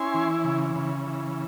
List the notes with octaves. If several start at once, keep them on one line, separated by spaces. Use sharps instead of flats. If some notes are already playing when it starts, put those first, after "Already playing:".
Already playing: C#4 E4 G#5 C6
E3
C#3
C#3
E3